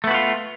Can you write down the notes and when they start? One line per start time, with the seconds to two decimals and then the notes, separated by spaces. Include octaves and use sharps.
0.04 A3
0.07 B3
0.11 F#4
0.14 F4